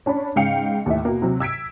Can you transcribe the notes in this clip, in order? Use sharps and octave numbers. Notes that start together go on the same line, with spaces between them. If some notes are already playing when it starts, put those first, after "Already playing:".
C#4 D4 C#5 B5
G#2 C#3 F5 G5 C#7 F7
D#2 A2 E5
B2 A#3
C3 F#3
E6 G#6 B6 D7